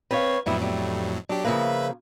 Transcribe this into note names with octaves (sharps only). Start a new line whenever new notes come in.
C4 B4 C#5 F5
F2 A2 F#3 G3 B3 E4
G3 A3
F#3 D4 G4
C#3 F3 A#3 B4 E5